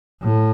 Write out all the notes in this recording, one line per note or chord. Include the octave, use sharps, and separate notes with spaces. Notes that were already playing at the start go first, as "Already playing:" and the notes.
A2